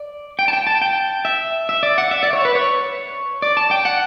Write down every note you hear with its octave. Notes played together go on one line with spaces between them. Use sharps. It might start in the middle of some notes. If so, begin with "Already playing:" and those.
Already playing: D5
G5
A5
G5
A5
G5
E5
E5
D5
F#5
E5
D5
C#5
B4
C#5
D5
A5
G5
F#5